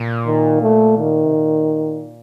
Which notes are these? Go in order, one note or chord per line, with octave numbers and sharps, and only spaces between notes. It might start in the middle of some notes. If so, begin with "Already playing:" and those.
Already playing: A#2
D#3
A3
D#3
C3
A#2